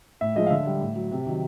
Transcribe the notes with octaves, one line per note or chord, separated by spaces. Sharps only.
A2 E5
F3 G#3 D#5
F5
D3 E5
G3
A2
F#3
C3
D#3 F#3